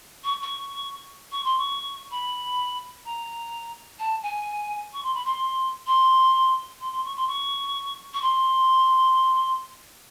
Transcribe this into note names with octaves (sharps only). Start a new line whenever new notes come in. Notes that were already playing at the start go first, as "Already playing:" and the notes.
C#6
C#6
C#6
C6
C#6
B5
A#5
A5
G#5
C#6
C6
B5
C6
C6
C6
C6
C#6
C6
C#6
C#6
C6